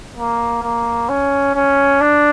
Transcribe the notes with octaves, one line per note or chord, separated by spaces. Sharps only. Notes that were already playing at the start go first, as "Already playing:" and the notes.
A#3
A#3
C#4
C#4
D4